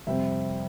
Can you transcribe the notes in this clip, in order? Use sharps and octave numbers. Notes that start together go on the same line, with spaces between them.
F2 C3 G3 C4 E5